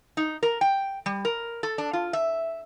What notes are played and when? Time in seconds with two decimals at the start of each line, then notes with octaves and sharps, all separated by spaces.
0.17 D#4
0.43 A#4
0.61 G5
1.06 G3
1.25 A#4
1.63 A4
1.78 D4
1.93 F4
2.13 E5